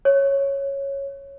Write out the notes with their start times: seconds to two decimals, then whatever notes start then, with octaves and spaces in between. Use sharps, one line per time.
0.05 C#5